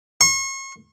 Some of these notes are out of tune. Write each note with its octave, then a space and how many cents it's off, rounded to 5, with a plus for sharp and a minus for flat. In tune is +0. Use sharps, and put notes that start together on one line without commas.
C#6 -40